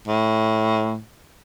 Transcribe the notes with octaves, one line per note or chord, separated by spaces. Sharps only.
A2